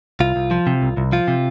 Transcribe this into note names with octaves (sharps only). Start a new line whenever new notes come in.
C2 F4
C2
F3
C3
C2
C2
F3 F4
C3